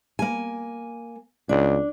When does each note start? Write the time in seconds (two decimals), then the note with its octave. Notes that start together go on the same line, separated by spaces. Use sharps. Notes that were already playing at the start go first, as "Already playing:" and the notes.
0.19 A#3 G#5
1.49 C#2 D4